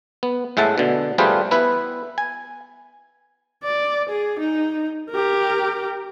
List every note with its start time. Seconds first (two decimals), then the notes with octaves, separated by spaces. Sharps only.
0.23 B3
0.57 A2 G#3 E5 F#5 A5
0.78 B2 D3
1.18 G3 A3 F4 G#4 B4 C5
1.51 B3 E4 B4
2.18 G#5
3.64 D5
4.09 G#4
4.39 D#4
5.10 G4 A#4